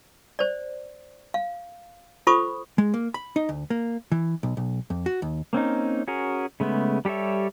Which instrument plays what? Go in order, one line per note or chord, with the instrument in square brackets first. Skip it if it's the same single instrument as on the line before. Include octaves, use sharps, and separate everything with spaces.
[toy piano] C5 D5
F5
F4 A4 C5 B5 C#6 D#6
[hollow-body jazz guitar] G#3
A#3
B5
D#4
D2
A#3
E3
B1
B1
F2
F#4
D#2
[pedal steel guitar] A#3 C4 C#4 D#4
C#4 F#4 G#4 A#4
C#3 G#3 A3 B3
G3 G4 A4 C#5 E5